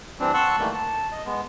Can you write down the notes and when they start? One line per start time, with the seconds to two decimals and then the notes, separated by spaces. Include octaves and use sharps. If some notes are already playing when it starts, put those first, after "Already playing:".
0.20 E3 G3 C4 D4
0.34 F#5 A5 C6 C#6 E6 F#6
0.59 D#3 E3 G3 A3 A#3
0.74 A5
1.12 D#5
1.25 G#3 B3